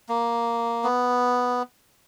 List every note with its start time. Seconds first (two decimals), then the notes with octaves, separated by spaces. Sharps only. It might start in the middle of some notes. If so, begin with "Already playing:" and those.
0.09 A#3
0.84 B3